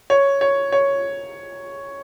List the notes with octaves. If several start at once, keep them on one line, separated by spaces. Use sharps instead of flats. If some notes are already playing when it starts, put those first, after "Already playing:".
C#5
C#5
C#5